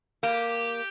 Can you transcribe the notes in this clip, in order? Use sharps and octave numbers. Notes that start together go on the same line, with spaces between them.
A#3 G4